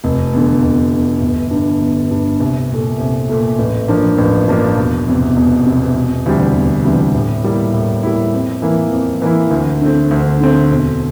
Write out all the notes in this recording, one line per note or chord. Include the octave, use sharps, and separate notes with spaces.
F1
E2 D3
F1
E2 D3
G1
G2 D3
G1
G2 D3
C2
A#2 A3
C2
A#2 A3
A1
G2 F3 A#3 D4
A1
G2 F3 A#3 D4
E1
E2 C3
E1
E2 C3
E1
D2 C3 E3 G3
E1
D2 C3 E3 G3
A2
G3 A#3 E4
A2
G3 A#3 E4
F2
E3 A#3 E4
F2
E3 A#3 E4
D2
D3 A3 C4
D2
D3 A3 C4
E1